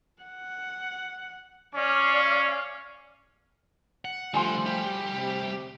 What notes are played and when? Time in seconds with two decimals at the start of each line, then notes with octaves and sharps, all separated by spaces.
0.23 F#5
1.75 C#4 D5 F5
4.05 F#5
4.34 D2 D3 F3 G3 A3 G5 G#5 C6
4.66 G4
5.14 C3